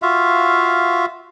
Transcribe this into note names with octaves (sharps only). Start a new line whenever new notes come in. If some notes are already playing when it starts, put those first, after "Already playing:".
F4 F#4 E5 F5